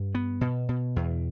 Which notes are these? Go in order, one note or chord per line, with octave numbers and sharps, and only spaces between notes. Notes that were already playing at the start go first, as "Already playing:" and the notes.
Already playing: G2
B3
B2
B2
E2